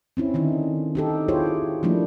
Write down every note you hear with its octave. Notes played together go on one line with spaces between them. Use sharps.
C4 C#4 E4
D3 D#3 D4 D#4
D#4 G4 A4
E4 F4 G4 G#4 C5 C#5
F3 G3 A3 A#3 D4 E4